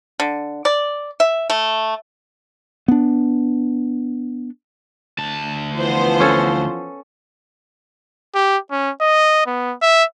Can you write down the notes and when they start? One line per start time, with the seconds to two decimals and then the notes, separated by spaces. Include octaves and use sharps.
0.20 D3
0.65 D5
1.20 E5
1.50 A3
2.88 B3 D4
5.18 D2 A5
5.76 E3 F3 B3 C5
6.20 C#4 A4 C#5
8.35 G4
8.71 C#4
9.01 D#5
9.47 B3
9.82 E5